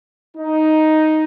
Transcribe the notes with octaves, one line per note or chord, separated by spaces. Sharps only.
D#4